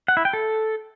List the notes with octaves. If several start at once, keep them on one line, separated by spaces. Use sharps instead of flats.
F#5
E4
G5
A4